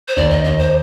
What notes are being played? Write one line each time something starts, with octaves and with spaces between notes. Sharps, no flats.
C5
D#2 D5
D#5
D#2 D#5
C5